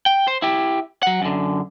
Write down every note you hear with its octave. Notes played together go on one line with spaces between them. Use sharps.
G5
C5
E4 G4
F#3 F#5
F#2 D3